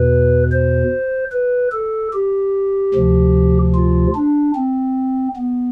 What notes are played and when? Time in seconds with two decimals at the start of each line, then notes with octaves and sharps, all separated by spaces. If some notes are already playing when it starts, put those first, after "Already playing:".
Already playing: E2 B2 B4
0.52 C5
1.32 B4
1.72 A4
2.13 G4
2.94 D2 C3 F3
3.75 F4
4.15 D4
4.55 C4
5.36 B3